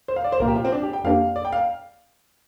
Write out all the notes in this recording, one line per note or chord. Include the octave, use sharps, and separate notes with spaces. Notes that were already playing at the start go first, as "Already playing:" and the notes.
C5
F5
D5
C5
C2 A#2 F3 A#3 A#4
G4
F4
C4
D4
G4
G5
F2 F3 A#3 D4 G4 F5
D5
G5
F5